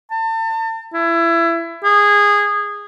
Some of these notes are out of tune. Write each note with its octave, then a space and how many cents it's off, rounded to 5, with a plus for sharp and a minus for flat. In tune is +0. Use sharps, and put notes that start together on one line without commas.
A5 +35
E4 +25
G#4 -15